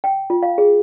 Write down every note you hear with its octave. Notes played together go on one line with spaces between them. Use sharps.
G5
F4
F5
G#4